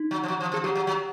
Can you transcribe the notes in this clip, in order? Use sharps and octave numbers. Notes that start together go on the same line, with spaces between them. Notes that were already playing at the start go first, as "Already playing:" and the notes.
Already playing: D#4
F#3
F3
F#3
F3
F3 G#4
F#3 G4
F#3
F#3